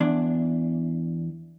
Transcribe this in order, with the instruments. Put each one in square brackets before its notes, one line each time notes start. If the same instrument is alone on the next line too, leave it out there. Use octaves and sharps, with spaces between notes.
[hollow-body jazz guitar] E2 D4